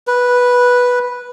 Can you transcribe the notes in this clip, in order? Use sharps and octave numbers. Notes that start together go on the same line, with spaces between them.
B4